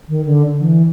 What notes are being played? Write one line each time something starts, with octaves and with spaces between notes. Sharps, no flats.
D#3
D3
E3